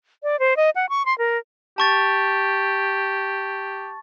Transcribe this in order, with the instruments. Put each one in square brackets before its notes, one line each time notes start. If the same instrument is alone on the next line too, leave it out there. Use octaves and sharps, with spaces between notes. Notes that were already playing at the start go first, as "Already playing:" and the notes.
[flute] D5
C5
D#5
F#5
C#6
C6
A#4
[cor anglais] G4 [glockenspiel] A5 C#6 A6